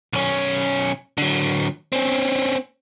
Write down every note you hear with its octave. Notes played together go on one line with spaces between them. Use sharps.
B1 C#4
D3 F#3
C4 C#4